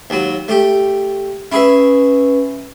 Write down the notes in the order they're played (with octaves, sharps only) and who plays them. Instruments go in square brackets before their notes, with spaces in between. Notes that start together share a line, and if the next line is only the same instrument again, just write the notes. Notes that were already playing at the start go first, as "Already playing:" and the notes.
[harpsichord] D#2 F#3
A3 G4
[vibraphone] C#4 B4 [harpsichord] E4 G#4 E5